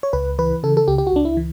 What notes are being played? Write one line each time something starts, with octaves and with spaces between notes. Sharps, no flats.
C#5
C#2 B4
E3 B4
C#3 A4
A4
C#2 G4
G4
F#4
C#2 D4
E4
E3